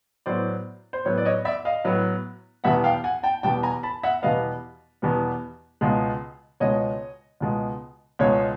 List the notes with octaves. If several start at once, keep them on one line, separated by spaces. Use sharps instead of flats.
A2 F#3 B3 C5 D5
C5
A2 F#3 B3 C#5
D5
C#5 D#5
D5 E5
D#5 F5
A2 F#3 B3
E2 B2 G3 B3 E5 F#5
F5 G5
F#5 G#5
G5 A5
E2 B2 G3 B3 G5 A5
G#5 A#5
A5 B5
E5 F#5
E2 B2 G3 B3 D#5 F5
E2 B2 G3 B3
C#2 B2 G#3
C#2 B2 G#3 C#5 D#5
C#2 B2 G#3
C#2 B2 G#3 C#5